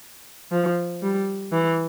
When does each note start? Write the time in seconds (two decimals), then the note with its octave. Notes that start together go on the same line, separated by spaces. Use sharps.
0.52 F3
1.03 G3
1.52 E3